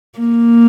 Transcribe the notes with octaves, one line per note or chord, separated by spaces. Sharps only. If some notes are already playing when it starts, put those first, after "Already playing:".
A#3